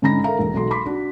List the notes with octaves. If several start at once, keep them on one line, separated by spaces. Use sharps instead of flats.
G#2 D3 C#4 A#5 B5 A#6
A4 A#4 E5 F5 A#5
E1
B1 F#4 A4 C6
B5 C6 D6 B6
D4 F#4